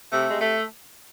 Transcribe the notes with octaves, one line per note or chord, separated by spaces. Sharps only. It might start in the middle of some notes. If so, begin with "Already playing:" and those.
C3 A3
C3 G#3
A3